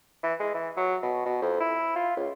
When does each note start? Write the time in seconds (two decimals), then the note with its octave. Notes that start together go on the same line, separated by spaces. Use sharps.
0.23 E3
0.39 G#3
0.54 E3
0.76 F#3
1.02 B2
1.25 B2
1.42 F2
1.60 E4
1.96 F4
2.17 C#2